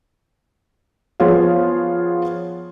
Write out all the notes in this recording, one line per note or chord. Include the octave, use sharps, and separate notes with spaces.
F3 B3 F4 G#4 C#5 F5